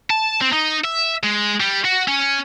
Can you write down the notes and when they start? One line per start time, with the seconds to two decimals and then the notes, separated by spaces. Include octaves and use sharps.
0.10 A5
0.41 C4
0.53 D#4
0.84 E5
1.24 G#3
1.60 G3
1.85 F#4
2.08 C#4